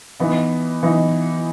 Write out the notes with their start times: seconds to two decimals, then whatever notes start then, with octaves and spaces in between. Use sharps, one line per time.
0.20 E3 B3 D#4
0.83 E3 B3 D#4